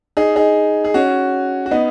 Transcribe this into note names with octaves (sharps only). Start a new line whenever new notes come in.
D#4 G#4
D#4 G#4
G#4
C#4 F#4
F#4
B3 D#4